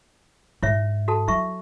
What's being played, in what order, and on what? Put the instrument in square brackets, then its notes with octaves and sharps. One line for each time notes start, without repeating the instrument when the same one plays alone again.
[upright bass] G#2 [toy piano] E4 C#5 E5
[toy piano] F#4 A4 A5
[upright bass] F#3 [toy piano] E4 E5 C#6